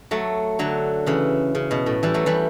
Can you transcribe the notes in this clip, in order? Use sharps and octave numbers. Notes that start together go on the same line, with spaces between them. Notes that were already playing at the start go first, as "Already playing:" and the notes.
F#3 A3
D3 F#3
C#3 E3
C#3
B2
A2
E3 G3
F#3 A3
E3 G3